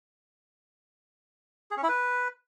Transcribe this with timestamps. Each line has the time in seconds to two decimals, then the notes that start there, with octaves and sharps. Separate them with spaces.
1.71 G#4
1.77 C#4
1.83 E4
1.89 B4